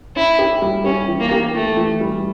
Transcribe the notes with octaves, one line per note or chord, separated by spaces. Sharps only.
C#4 E4
G4
G3
C#4 G4
E3
A#3
G4
E3 A3
E3
G3